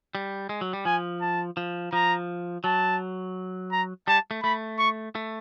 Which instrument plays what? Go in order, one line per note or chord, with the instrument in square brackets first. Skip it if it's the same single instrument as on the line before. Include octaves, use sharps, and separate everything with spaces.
[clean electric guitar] G3
G#3
F#3
G3
[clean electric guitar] F3 [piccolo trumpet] G#5
[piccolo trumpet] A5
[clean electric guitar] F3
[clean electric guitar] F3 [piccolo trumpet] A#5
[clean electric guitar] F#3 [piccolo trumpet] A5
[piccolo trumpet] A#5
[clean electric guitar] G3 [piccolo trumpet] A5
[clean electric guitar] A3
[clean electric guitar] A3 [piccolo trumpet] B5
[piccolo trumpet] C#6
[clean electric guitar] A3